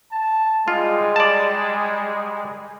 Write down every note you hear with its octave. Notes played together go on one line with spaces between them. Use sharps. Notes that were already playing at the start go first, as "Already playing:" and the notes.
A5
G3 G#3 F4
D5 A5